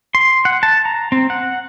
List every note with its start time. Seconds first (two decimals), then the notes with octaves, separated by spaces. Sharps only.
0.15 C6
0.45 F#5
0.63 A5
0.85 A#5
1.12 C4
1.30 F#5